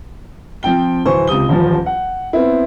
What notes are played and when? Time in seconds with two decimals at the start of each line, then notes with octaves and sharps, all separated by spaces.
0.63 F3 C4 G5 G7
1.06 D1 E3 C5 C#6
1.27 C#2 C3 D#6 G7
1.49 D#1 A1 F3
1.86 F#5
2.33 B3 C4 E4